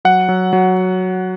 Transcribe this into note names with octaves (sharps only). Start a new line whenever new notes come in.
F#3 F#5
F#3
F#3